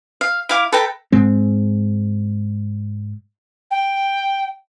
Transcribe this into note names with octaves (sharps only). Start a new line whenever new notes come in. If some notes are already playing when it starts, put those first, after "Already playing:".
F5
E4 F5 D6
A4 B4 G5 A#5
G#2 G#3 C4
G5